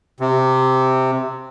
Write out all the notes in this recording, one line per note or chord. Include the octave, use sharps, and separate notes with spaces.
C3